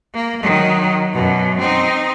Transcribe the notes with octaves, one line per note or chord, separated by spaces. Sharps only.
A#3
D#3 F#3
F#2 B2
C4 D#4